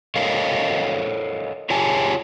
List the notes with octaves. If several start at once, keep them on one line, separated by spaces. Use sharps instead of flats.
A4 A#4 C#5 D#5 F5
F4 G4 G#4 C#5 G#5 A5